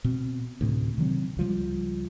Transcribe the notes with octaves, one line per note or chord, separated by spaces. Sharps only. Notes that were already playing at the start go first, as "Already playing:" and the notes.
B2 C4
D2 A2 C3
C3 D#3 F#3 C4
C#2 F3 G3